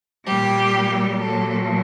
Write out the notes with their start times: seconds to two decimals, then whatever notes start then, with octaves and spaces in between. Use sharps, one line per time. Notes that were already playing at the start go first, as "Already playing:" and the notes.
0.24 A#2 G3 G4
1.20 A#2 F#3 A4